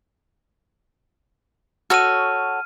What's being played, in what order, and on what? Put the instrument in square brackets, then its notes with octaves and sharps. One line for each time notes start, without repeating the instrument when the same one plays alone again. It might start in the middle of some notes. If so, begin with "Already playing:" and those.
[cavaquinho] F#4 A4 C#5 [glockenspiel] F6 D#7